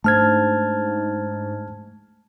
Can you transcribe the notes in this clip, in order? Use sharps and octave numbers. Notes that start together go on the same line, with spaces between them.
G#2 A3 D4 C5 A5 F6 G#6 A6